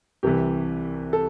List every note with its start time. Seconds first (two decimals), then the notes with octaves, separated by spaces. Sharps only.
0.23 C2 C3 E3 G4
1.13 A4